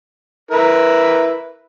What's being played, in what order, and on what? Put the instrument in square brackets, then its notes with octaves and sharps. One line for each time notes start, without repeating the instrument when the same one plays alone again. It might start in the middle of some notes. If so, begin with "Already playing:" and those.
[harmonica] E4 A#4 B4